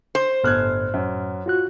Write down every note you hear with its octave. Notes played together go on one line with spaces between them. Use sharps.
C5
G1 A2 F6 F#6 G#6
F#2
F4 F#4 F#6